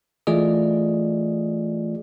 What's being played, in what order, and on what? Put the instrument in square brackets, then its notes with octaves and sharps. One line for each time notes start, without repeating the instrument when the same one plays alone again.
[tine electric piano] E3 A3 F4 G#4 D5 D#5